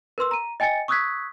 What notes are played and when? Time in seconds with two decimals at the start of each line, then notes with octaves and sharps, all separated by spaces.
0.18 A#4 B4 C6 E6
0.31 A#5 D#7
0.60 D#5 G5 G#5 A6 C#7
0.88 C#6 D#6 E6 F#6 G#6 B6